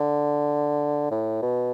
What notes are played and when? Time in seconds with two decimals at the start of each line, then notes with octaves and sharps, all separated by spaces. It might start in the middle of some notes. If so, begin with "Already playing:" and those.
Already playing: D3
1.11 A2
1.42 B2